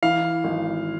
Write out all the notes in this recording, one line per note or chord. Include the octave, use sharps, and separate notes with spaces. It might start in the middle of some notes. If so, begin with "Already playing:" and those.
E3 F5
G#1